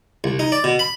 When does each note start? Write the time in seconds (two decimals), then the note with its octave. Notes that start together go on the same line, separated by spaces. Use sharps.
0.24 C2
0.39 D#4
0.52 D5
0.64 B2
0.79 B5